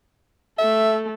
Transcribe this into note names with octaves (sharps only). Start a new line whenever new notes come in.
A3 A4 E5